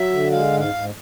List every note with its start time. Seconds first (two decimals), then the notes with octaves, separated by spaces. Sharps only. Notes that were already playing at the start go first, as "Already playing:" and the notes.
Already playing: F#3 E5
0.11 D3
0.32 G#3 F5
0.53 G#2
0.60 F5
0.74 G#2